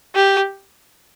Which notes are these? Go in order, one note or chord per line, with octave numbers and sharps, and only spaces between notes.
G4